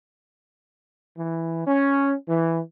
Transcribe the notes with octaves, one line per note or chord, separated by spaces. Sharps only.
E3
C#4
E3